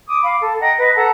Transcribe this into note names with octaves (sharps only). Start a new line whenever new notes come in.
D6 D#6
F5 B5 D6
A4
D#5 F#5 G5 A#5
B4 D#5
A4 F#5 A5 A#5